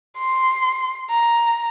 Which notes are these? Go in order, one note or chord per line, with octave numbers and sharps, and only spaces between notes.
C6
A#5